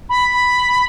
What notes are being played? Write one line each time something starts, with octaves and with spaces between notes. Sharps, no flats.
B5